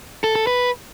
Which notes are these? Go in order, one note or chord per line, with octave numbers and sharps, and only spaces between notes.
A4
A4
B4